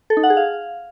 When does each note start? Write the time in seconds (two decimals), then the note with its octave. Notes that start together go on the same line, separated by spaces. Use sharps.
0.10 A4
0.17 D#4
0.23 F#5
0.30 G#4
0.37 F5